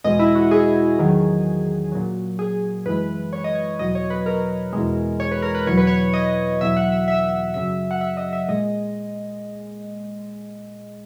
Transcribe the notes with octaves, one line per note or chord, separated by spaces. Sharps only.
E2 B2 G#3 D#5
E4
F#4
G#4
E2 D#3 F#3
A#2 F#3
G#4
F#2 E3 G#3 B4
C#5
D#5
C#5
E2 B2 F#3 D#5
C#5
B4
A#4
E2 B2 G#3
C#5
B4
A#4
B4
E2 B2 F#3 C#5
B4
C#5
D#5
E2 B2 F#3 E5
F#5
E5
E5
F#2 C#3 F#3 E5
F#5
E5
D#5
E5
A#2 G#3 D#5